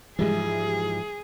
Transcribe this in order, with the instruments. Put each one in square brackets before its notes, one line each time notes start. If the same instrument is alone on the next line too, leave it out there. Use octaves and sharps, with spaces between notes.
[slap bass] G#2 F3 [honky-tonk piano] E3 G3 G#3 [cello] G#4